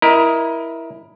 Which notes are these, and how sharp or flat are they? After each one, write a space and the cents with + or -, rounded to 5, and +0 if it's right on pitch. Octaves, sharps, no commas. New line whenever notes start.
E4 +0 A#4 +20 D#5 +10